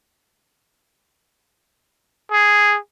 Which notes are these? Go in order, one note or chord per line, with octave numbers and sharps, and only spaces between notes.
G#4